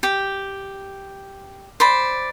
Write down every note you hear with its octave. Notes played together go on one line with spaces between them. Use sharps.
G4
C5 D5 B5